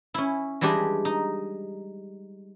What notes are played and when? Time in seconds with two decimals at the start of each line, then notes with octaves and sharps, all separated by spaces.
0.14 C#4 E4
0.61 E3 G3 G#3 D4 G4 D#5
1.05 D#4